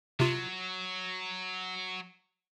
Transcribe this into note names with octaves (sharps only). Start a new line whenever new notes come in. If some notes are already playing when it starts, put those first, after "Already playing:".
C3 F#3 F4